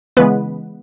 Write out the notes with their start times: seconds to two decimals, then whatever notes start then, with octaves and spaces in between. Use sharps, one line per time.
0.17 C#3 E3 G#3 B3 B4